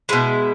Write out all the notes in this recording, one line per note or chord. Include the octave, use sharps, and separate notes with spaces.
B2 G#3 E4